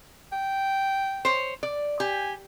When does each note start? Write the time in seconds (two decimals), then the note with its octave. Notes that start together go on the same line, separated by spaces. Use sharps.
0.32 G5
1.25 C5 C#5
1.63 D5
2.00 G4 G#5